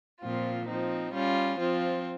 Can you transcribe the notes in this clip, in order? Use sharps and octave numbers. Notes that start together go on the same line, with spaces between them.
A#2 F3 C4 F4
F3 C4 D#4
G3 C#4 F4
F3 C4 F4